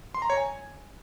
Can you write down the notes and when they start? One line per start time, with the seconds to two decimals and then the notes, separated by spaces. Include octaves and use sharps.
0.14 C6
0.22 A#5
0.30 C#5
0.37 G#5